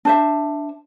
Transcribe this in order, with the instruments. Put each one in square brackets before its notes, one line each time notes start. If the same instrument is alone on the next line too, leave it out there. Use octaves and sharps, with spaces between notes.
[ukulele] D4 C5 E5